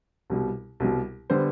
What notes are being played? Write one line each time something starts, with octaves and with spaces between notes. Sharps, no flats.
C2 B2 G3
C2 B2 G3
D3 G3 B3 C5